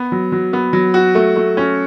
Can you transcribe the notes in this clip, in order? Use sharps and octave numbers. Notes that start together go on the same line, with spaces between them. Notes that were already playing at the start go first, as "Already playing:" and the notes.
Already playing: B3
F#3
F#3
B3
F#3
F#4
A3
A3
C#4